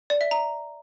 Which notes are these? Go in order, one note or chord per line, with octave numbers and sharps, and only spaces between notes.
D5
E5
A#5